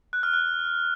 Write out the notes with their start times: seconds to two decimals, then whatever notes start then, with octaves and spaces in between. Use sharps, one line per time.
0.13 F#6
0.23 F6
0.33 F#6